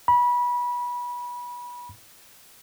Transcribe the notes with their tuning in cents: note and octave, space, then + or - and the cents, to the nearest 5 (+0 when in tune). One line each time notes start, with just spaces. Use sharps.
B5 -25